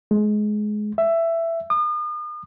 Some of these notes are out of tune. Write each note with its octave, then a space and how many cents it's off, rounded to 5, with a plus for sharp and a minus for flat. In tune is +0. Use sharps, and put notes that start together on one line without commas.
G#3 +20
E5 +15
D#6 -40